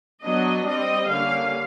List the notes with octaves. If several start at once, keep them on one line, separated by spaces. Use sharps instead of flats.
F#3 B3 D4 D#5
G3 C4 D#5
D3 G3 A#3 C#4 F5